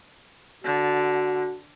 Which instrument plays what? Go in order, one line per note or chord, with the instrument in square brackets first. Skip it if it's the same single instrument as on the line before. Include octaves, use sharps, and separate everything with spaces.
[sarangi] D3 [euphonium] F#4